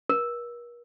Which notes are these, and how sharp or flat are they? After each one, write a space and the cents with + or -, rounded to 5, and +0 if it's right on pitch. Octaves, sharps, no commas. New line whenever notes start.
A#4 +45